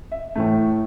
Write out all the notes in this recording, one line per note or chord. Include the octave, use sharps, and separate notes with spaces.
E5
A2 E3 A3